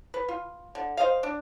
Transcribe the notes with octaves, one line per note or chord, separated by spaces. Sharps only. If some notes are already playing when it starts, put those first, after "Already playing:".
B4
F4
D3
C5 D#5 F5
D4